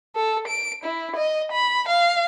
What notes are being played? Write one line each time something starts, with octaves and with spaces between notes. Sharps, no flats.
A4
D7
E4
D#5
B5
F5